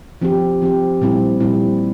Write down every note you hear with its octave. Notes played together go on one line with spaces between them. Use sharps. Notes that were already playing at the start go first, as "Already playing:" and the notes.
F3 C4 G4
F3 C4 G4
A#2 G3 C4 E4
A#2 G3 C4 E4